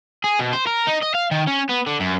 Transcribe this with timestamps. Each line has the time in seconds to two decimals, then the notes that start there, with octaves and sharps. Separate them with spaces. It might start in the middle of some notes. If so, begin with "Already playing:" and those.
0.24 G#4
0.39 B2
0.53 C5
0.67 A#4
0.87 D#4
1.03 D#5
1.15 F5
1.31 D#3
1.47 C#4
1.69 B3
1.86 D3
2.00 F#2